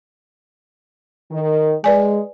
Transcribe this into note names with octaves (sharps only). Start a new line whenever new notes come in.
D#3
G#3 B4 D5 G#5